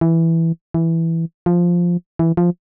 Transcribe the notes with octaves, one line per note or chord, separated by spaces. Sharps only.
E3
E3
F3
E3
F3